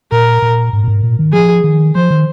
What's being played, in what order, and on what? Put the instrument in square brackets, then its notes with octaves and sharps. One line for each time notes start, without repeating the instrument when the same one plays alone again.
[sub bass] A#2 [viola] A#4
[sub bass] A#2
G#2
A#2
G#2
A#2
D#3
[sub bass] F3 [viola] G#4
[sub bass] D#3
[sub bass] F3 [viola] C5
[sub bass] D#3